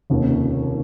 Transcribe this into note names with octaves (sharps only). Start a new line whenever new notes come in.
F1 D#2 C#3